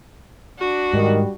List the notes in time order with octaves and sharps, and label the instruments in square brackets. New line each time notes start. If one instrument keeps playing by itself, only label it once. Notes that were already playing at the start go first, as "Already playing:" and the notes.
[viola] D4 F#4
[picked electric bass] G#2 [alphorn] D#3 [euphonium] G3